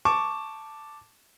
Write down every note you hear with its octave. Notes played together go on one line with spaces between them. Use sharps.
A5 C#6 D6